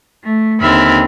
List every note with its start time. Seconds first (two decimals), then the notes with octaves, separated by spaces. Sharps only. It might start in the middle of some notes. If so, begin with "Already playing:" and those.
0.23 A3
0.60 D#2 D3 C4 E5 B5 F6